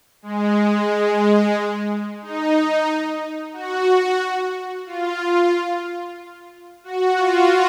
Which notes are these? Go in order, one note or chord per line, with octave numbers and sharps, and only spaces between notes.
G#3
G#3
D#4
F#4
F4
F#4
F4